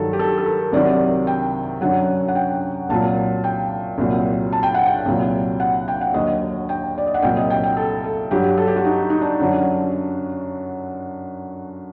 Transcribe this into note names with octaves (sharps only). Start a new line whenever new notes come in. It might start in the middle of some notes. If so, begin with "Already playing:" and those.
Already playing: G2 D#3 F#3 A4
G4
A4
A4
A#4
C2 C3 D#3 F#3 D5
G5
F#2 D3 F#3 F#5
F#5
G5
C2 A#2 F#3 A5
G5
C2 A#2 F#3
A5
G5
F#5
G5
C2 A#2 F#3
F#5
G5
F#5
D#2 D3 F#3 D#5
G5
D5
D#5
F#5
C2 A#2 F#3 G5
D#5
G5
G5
A4
A4
G2 F#3 G4
A4
G4
F#4
D#4
D#4
D4
F#2 D3 F#3